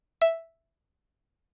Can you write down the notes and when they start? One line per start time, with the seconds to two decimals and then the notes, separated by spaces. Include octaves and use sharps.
0.22 E5